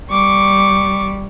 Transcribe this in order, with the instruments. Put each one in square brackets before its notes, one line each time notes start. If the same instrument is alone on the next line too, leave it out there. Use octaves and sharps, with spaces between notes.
[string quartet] G3 [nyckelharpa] C#6 D6